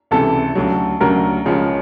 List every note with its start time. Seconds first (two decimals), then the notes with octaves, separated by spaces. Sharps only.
0.11 C#2 C3 E3 A4
0.55 D2 C#3 F#3
1.01 D2 C#3 F#3 A#4
1.45 C#2 C#3 F3 G#3 C#4